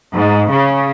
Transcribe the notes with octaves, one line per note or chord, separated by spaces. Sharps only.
G#2
C#3